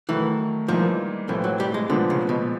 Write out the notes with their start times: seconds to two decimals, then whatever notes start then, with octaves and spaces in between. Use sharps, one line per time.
0.09 D#3 E3 F#3 A3
0.68 G#2 E3 F3 G3 A#3 D#4
1.29 A2 E3 F3 A3 C4 E4
1.44 F#3
1.60 G3
1.74 G#3
1.89 A#2 D3 F3 G#3 B3
2.10 C#3
2.29 B2